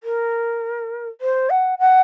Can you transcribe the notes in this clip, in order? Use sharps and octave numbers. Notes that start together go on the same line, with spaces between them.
A#4
C5
F#5
F#5